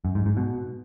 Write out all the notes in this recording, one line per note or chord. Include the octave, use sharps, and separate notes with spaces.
F#2
G#2
G#2
B2